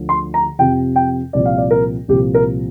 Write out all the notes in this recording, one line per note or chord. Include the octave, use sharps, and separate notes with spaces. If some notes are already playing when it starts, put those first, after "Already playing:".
Already playing: D2 D3 F3
C6
A#5
F2 C3 F3 G5
G5
C2 A#2 F3 D5
F5
D5
A#4
C2 A#2 F3 G4
A#4